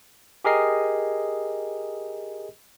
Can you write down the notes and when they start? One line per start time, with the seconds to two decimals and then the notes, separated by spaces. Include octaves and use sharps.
0.45 G4 G#4 A#4 D#5 C7